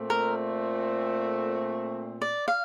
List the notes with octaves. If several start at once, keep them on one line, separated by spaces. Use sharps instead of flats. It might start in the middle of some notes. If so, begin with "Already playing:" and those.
Already playing: A#2 A3 C4
A#4
D5
F5